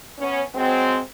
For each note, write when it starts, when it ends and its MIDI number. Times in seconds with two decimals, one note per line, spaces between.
0.19 0.42 59
0.19 0.42 61
0.55 0.98 54
0.55 0.98 56
0.55 0.98 60